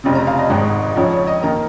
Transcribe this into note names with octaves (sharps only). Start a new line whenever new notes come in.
F1 F2 C#3
A#5
F5
D#5
G#1 G#2 D#3 G#3
C#2 C#3 F3 C#5
C#5
D#5
D#3 A#3 A#5